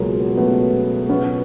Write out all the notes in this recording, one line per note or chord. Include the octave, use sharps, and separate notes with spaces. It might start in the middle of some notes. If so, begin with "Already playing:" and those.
Already playing: C#2 B2 F#3 G#3 A#3
A3 B3
B3 C#4